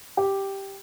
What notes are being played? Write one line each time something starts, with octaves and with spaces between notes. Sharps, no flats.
G4